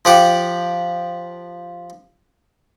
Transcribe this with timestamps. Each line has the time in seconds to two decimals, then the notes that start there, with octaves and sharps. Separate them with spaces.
0.05 F3 G4 F#5